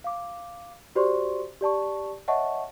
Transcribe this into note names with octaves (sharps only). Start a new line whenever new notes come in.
F5 D6
F#4 G4 C5 D5 C6 C#6
G4 D5 A5 C#6
C#5 D#5 E5 F#5 A5 C#6